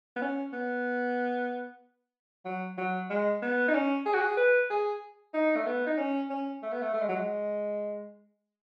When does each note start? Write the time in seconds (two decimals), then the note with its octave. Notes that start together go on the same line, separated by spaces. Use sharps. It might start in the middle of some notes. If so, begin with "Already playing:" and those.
0.16 B3
0.21 C#4
0.53 B3
2.45 F#3
2.77 F#3
3.10 G#3
3.42 B3
3.68 D#4
3.74 C#4
4.06 G#4
4.13 F#4
4.21 G#4
4.37 B4
4.70 G#4
5.33 D#4
5.56 A3
5.66 B3
5.86 D#4
5.98 C#4
6.30 C#4
6.62 A3
6.72 B3
6.82 A3
6.94 A3
7.02 G#3
7.08 F#3
7.16 G#3